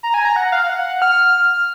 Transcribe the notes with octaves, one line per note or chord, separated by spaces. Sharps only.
A#5
G#5
A#5
F#5
F5
F#5
F6